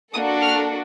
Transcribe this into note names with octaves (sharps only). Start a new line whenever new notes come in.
A#3 D4 F#4 A4 D#6
F6